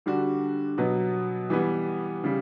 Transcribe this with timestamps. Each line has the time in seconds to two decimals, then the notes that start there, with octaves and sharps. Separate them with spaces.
0.06 D3 G3 D4 F#4
0.78 B2 F#3 B3
1.50 E3 G3 B3
2.24 C#3 G3